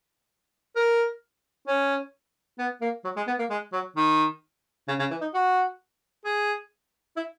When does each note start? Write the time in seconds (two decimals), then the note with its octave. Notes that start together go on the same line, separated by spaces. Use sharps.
0.76 A#4
1.67 C#4
2.59 B3
2.81 A#3
3.04 F#3
3.16 G#3
3.27 B3
3.39 A#3
3.50 G#3
3.73 F#3
3.96 D#3
4.88 C#3
4.99 C#3
5.11 E3
5.21 D#4
5.34 F#4
6.25 G#4
7.16 E4